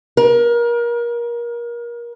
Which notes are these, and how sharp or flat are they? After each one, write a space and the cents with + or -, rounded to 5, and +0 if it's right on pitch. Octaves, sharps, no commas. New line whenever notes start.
A#4 +30